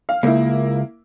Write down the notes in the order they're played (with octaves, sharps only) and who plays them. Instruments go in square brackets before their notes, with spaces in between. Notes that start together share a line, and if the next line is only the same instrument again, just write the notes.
[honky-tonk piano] F5
[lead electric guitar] C#2 [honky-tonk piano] A#3 E4